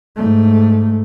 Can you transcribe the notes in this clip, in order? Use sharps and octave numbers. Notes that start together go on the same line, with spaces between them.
G#2 A3